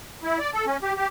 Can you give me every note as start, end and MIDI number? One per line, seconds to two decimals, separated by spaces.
0.23 0.38 64
0.39 0.51 74
0.53 0.65 69
0.66 0.77 61
0.83 0.93 67
0.97 1.08 67